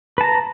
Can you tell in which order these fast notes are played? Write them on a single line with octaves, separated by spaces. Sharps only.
B4 A5 A#5